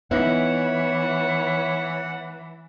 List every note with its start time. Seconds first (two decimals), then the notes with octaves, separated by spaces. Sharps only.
0.11 E3 B3 D#4 E4 C#5 F#5